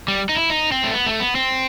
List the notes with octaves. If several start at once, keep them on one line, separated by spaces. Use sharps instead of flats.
G3
D#4
E4
D#4
C4
A3
B3
A3
B3
C4